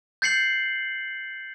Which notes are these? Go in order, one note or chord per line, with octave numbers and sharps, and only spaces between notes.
G6 A6 C7 C#7 F#7